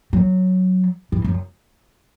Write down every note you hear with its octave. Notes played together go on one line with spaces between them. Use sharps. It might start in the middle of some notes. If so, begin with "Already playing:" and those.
F#3
E3
F#2